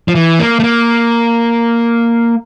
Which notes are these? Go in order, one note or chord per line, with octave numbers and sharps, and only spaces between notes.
F3
E3
A#3
A3
A#3